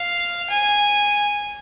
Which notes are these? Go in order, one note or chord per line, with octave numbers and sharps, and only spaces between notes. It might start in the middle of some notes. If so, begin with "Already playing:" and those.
Already playing: F5
G#5